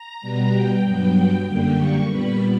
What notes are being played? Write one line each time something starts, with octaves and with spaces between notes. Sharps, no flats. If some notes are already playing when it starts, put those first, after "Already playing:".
Already playing: A#5
B2 G3 B3
G5
G2 F#3 B3 G5
F#2 D3 G3 A#3 G5
C#6
A#2 G3 B3 B5